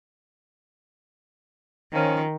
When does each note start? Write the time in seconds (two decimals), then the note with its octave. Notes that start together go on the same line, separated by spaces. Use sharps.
1.94 D#3 F3 C#4